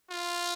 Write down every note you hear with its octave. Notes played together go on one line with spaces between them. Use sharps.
F4